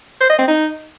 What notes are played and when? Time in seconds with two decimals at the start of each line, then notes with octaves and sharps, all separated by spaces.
0.20 C5
0.29 D#5
0.39 C4
0.48 D#4